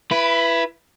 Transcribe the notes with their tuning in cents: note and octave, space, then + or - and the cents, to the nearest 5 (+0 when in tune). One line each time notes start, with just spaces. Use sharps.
E4 +25 B4 +0